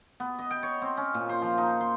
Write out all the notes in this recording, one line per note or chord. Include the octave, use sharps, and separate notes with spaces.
B3
D#5
G5
C#5
C4
C#4
A#2
C5
F3
D#4
C6